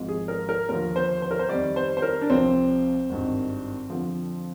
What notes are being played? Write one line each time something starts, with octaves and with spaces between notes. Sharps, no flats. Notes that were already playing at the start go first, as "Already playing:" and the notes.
Already playing: G#1 G#2 F3
G#4
A#4
A#4
D#2 D3 F3 A#4
C5
C5
A#4
C5
F2 D#3 G3 D5
C5
C5
A#4
D4
C2 C3 F3 C4
G#1 G2 D#3
F2 D3 F3